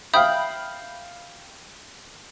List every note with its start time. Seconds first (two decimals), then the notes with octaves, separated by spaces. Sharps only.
0.14 E5 F5 G5 B5 D#6 G6